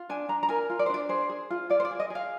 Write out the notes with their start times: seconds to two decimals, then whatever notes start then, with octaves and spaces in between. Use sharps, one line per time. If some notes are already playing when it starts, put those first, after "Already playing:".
Already playing: F4
0.09 D4 G#5
0.29 D4 A#5
0.43 A#5
0.49 A#4 G#5
0.70 F4
0.79 D5
0.86 C5
0.89 D4 D5
1.09 G#4 C5
1.29 G#4
1.50 F4
1.70 F4 D5
1.80 C5
1.85 D5
1.91 G#4
2.00 D#5
2.10 G#4 F5